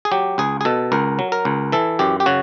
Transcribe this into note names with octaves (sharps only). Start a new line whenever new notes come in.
G#4
F#3 G4
C#2 G#4
G#4
B2 A4
C#2 A#4
F#3
A#4
C#2
E3 A4
F#2 G4
G4
C#3 F#4